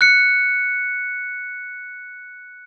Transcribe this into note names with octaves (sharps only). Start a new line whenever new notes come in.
F#6 C#7